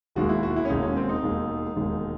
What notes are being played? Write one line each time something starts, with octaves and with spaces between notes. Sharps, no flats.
E1 D#2 D#3 G#3 F#4
E4
F#4
E4
C#4
E1 D#2 D#3 G#3 D#4
C#4
C4
D#4
E1 D#2 D#3 G#3
E1 D#2 D#3 G#3